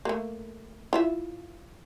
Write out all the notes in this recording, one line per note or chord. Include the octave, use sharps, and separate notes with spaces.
A3 A#3
E4 F4 E5